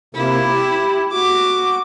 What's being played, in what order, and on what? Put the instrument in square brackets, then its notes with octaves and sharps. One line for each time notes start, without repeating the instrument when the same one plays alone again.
[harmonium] C3 A#3 [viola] E4
[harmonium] G4
[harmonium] F#4 [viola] D6